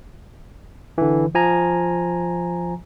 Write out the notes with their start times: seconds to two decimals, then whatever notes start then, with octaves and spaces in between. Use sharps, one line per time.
0.98 D3 E3
1.35 F3 G#5 A#5